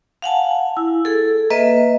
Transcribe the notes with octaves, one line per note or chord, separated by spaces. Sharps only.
F5 F#5 G#5 A5
E4
G#4 A4
A#3 B4 D#5 E5